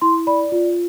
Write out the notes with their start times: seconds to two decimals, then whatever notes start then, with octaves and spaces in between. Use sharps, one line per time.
0.02 E4 C6
0.27 D5 B5
0.52 F4